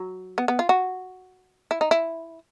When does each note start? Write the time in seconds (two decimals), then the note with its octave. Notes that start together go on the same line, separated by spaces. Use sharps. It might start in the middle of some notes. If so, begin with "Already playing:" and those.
Already playing: F#3
0.38 B3
0.48 B3
0.59 F4
0.69 F#4
1.71 E4
1.81 D#4
1.91 E4